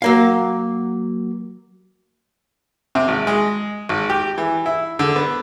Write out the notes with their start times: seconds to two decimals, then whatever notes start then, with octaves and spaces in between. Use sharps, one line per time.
0.02 F#3 A#3 F5
2.95 C3
3.08 G#1
3.27 G#3
3.89 G#1
4.10 G4
4.38 E3
4.66 E4
4.99 D3
5.16 B3